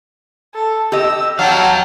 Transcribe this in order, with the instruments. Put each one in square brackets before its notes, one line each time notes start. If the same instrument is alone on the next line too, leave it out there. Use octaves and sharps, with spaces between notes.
[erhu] A4
[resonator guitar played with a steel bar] G4 D#5 [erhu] E6
[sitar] F#3 [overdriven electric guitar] F5 G5 [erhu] A5